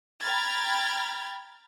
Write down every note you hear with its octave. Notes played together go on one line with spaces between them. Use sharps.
G5 A#5 B5 F6 G#6 A6